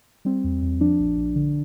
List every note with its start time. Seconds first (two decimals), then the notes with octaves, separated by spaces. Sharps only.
0.25 G3 C4
0.44 E2
0.62 E2
0.81 F3 D4
0.99 A#1
1.17 A#1
1.35 D3